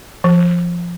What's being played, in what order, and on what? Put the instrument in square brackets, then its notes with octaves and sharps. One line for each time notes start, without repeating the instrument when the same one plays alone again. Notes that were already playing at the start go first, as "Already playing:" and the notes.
[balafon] F3